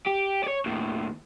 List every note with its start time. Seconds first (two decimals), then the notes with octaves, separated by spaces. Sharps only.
0.06 G4
0.44 C#5 D5
0.66 D#2 A2